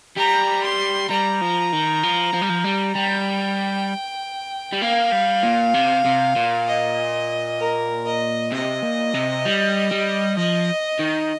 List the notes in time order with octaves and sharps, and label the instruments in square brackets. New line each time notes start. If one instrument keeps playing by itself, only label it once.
[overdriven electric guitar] G3 [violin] A#5
[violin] C6
[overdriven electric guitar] G3 [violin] A#5
[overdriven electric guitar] F3
D#3
F3
F3
G3
F3
G3
[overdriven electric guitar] G3 [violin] G5
[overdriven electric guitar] G3
[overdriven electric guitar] A#3 [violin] F5
[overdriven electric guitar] G3
A#2
C3
C3
A#2
[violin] D#5
A#4
D#5
[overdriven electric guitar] C3 [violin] D#5
[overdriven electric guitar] A#2
C3
G3
G3
[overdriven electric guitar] F3 [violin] D#5
[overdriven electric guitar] D#3